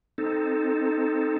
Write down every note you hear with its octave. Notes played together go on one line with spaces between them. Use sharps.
C4 D#4 A4